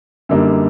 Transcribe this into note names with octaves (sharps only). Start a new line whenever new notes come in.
F#2 D3 G3 A#3 D#4